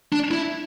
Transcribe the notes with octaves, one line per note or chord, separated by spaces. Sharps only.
D4
E4